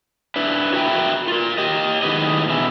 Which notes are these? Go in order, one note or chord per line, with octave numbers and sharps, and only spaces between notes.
D4 E4 B4
F#4 A#4 B4 E5 F#5 G5
F4 A#4
G4 D#5
A2 D#3 G#3 B3 B4 D#5
B2 E3 E4